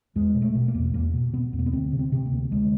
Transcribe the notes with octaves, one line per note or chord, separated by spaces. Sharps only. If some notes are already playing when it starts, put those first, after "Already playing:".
E2 G#3
B2
A3
B2
A#3
E2
E2 A#3
B2
B2 B3
E2
A#3
B3
D2 C4
C3
C4
C3
A#3
D2
D2 G#3